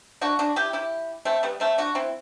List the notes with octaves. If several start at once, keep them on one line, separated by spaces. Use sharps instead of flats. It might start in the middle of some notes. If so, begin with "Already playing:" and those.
D4 F#4
D4 F#4
E4 G4
E4 G4
A3 C4
G3 B3
A3 C4
D4 F#4
C4 E4